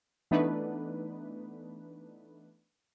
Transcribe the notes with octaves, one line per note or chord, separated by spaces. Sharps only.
E3 A3 B3 D4 D#4 B4